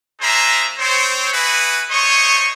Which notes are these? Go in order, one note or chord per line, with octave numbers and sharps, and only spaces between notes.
A#3 D4 G#4 C5 E5 A#5
C4 C5 C#5
E4 F#4 G#4 B4
A3 D#4 C5 C#5 D#5 C#6